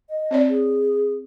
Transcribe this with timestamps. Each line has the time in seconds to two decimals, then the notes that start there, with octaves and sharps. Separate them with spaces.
0.09 D#5
0.31 C4 C#5 D5
0.49 G#4